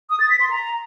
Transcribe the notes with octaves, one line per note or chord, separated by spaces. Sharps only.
D#6
A6
B6
C6
A#5